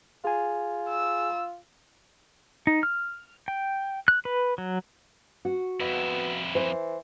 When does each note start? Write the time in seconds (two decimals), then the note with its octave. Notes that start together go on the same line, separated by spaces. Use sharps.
0.24 F4 G#4 G#5
0.89 E6
2.67 D#4
2.83 F6
3.48 G5
4.08 F#6
4.25 B4
4.58 F#3
5.45 F#4
5.80 F2 B3 E4
6.55 E3 C5